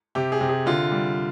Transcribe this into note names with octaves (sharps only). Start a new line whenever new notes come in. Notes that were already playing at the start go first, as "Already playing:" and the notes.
C3 G4
G#4
C3
G#4
D3 F4
G3